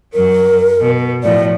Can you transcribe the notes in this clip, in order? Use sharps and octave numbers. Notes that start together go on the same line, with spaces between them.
F#2 F#3 A#4
B2
A2 F3 D5